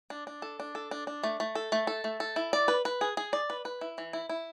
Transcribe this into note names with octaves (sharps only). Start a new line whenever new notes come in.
D4
D4
A4
D4
A4
D4
D4
A3
A3
A4
A3
A4
A3
A4
E4
D5
B4
B4
G#4
G#4
D5
B4
B4
E4
E3
E4
E4